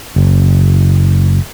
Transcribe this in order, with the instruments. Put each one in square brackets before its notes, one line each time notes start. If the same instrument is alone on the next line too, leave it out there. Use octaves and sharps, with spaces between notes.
[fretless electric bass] F#1